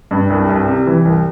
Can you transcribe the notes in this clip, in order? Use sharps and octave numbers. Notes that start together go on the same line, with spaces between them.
G2
C2
C2
C3
E3
C2